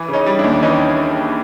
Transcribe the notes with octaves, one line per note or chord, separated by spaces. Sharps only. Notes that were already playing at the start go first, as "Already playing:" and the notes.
Already playing: E3
C#3
C#4 D#4
G3
D#2 D4 E4
E3 C#4 D#4